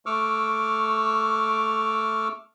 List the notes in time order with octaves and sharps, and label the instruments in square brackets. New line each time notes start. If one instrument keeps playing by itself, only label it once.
[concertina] A3 C#6 D6 E6 F6